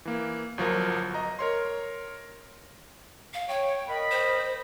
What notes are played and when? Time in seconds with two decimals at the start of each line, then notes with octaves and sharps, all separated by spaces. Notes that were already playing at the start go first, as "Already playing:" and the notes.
0.05 E3 A#3
0.58 G1 F3 F#3 A#4
1.14 D#5 A#5
1.39 A#4 C#5 C6
3.34 F5
3.48 C#5 G5
3.89 A#4 D#5 B5
4.11 C5